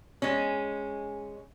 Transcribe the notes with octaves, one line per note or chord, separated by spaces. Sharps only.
G#3 C#4